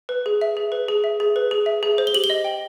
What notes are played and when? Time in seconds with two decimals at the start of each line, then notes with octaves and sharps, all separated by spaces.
0.09 B4
0.26 G#4
0.41 E5
0.57 G#4
0.72 B4
0.88 G#4
1.04 E5
1.20 G#4
1.36 B4
1.51 G#4
1.66 E5
1.83 G#4
1.98 C5
2.07 G7
2.14 G4 F#7
2.24 G7
2.30 D#5
2.45 G5